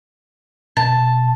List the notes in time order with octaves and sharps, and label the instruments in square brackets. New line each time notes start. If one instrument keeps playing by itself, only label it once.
[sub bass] B2 [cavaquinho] A5